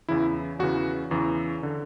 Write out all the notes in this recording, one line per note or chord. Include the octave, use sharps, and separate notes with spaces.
E2 C#3 E3 E4
E2 C#3 E3 F#4
E2 C#3 E3
D3